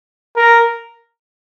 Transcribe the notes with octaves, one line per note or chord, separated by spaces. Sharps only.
A#4